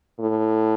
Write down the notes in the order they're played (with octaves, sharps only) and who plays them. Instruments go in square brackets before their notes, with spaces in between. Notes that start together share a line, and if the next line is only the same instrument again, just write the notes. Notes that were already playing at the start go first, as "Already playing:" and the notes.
[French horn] A2